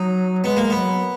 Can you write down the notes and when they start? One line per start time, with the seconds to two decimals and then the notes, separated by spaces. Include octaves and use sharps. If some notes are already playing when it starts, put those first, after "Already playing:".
Already playing: F#3 D#4
0.44 G#3 B3
0.57 A#3
0.70 B3
0.76 F#3